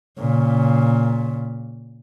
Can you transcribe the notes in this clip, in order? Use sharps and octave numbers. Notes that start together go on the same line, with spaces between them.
A#2 C#3